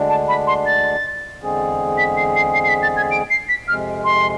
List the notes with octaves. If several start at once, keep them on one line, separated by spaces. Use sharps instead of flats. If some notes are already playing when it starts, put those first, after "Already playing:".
Already playing: D2 D3 G#3 D4
A5
B5
C6
A6
E2 D3 G#3 C4 G#4
B6
C7
C7
C7
C7
B6
A6
G#6
D7
C7
B6
F2 C3 G#3 F6
C6